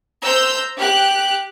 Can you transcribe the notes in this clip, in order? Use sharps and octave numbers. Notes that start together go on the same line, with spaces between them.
C5 A#5 E6 G6
G4 F#6